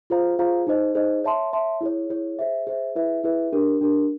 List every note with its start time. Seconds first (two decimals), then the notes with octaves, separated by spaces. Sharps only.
0.10 F4 G#4 C5 F5 A#5
0.39 F4 G#4 C5 F5 A#5
0.67 D#4 G#4 C5 D#5
0.95 D#4 G#4 C5 D#5
1.24 C#5 E5 A5 C6
1.53 C#5 E5 A5 C6
1.81 E4 G#4 C#5
2.10 E4 G#4 C#5
2.39 G#4 C5 E5
2.67 G#4 C5 E5
2.95 E4 G#4 B4 E5
3.24 E4 G#4 B4 E5
3.53 D4 G4 A#4
3.81 D4 G4 A#4